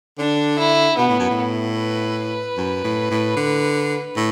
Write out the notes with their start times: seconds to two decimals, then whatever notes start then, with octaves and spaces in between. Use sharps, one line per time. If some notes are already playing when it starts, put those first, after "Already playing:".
0.18 D3 D4
0.59 E4
0.98 B2 B3
1.09 A2
1.20 F#2
1.31 A2
1.78 B4
2.57 F#2
2.84 A2
3.11 A2
3.37 D3
4.16 A2